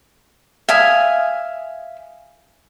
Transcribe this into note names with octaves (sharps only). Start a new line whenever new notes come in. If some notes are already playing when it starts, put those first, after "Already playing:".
E5 F5 G#5 D#6